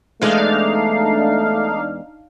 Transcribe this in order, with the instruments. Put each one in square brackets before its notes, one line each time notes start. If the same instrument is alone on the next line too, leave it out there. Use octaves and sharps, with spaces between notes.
[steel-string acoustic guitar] E2 G#3 [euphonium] A3 [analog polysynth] D4 D#4 F5